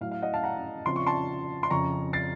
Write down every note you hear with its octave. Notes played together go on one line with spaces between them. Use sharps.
A2 F#3 A3 F5
F5
D#5 F#5
F5 A5
F#5 A#5
C#3 F3 C4 F4 C6
C#6
A5 C6
C6
F2 C#3 F3 A#5 C#6
A6 C7